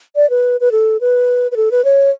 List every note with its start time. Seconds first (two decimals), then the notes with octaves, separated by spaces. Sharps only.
0.16 D5
0.30 B4
0.61 B4
0.72 A4
1.01 B4
1.51 B4
1.56 A4
1.71 B4
1.85 C#5